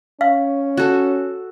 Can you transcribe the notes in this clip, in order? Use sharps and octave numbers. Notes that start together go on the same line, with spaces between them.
C#4 F5
F#4 A4